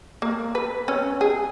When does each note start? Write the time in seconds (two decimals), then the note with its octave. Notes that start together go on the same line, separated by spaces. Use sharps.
0.22 A#3
0.55 B4
0.88 C#4
1.21 G#4